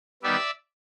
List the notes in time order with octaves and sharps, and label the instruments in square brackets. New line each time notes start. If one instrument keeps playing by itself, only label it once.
[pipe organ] D#3 G3 B3 D5 E5